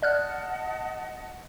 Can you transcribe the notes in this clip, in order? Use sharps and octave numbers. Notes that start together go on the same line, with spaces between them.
D5 D#5 F#5 A5 F6 F#6